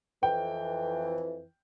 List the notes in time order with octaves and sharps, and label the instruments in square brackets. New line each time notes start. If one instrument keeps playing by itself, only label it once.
[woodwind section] F2 E3 [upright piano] G5